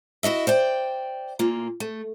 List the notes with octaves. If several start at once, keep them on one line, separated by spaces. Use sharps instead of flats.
E4 F#4 D#5 E5
C5 D5 G5
A#2 A#3 F4
A3